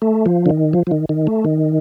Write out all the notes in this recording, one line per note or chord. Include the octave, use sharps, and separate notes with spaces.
A3
F3
D3
D#3
F3
F3
D#3
D#3
A3
D#3